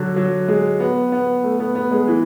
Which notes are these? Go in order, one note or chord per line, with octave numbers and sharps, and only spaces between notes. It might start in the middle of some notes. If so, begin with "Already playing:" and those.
Already playing: D3 F#3
F#3
G#3
B3
B3
A3
B3
B3
G#3
E3